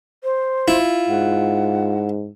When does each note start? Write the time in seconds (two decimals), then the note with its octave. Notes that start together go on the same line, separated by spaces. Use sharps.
0.24 C5
0.68 E4 F4
1.09 G#2 F#5